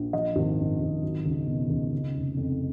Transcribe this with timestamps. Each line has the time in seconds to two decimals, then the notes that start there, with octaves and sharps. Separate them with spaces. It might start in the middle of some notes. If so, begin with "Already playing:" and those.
Already playing: A#1
0.13 F3 D#5
0.36 G#1
0.58 F#2
0.81 G#1
1.03 F#3
1.25 C#2
1.47 B2
1.70 C#2
1.92 C#3
2.14 F1
2.37 F2